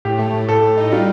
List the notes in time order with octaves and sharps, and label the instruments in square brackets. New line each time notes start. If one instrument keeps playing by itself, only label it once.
[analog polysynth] A2 [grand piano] G4
[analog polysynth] A3
A2
[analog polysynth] A2 [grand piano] A4
[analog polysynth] A2
D#4
[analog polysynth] G3 [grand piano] F4